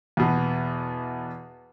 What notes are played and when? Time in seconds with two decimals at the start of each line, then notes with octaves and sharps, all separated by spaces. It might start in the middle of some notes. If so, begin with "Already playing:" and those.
0.17 E2 B2